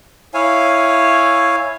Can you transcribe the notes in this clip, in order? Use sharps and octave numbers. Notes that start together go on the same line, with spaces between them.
E4 C#5 F5 G#5